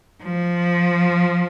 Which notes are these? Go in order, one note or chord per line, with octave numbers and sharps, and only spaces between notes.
F3